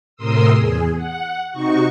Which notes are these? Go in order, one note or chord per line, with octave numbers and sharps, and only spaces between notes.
A2 C3 A#4 C6 D#6 E6
E2 G#4
F#5
C3 D#4 F#4 C#6